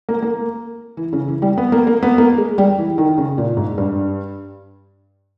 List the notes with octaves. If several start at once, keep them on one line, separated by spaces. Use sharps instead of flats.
A#3
A#3
E3
C#3
E3
G3
B3
A#3
A#3
B3
A#3
G#3
G3
E3
D#3
C#3
A#2
G#2
G2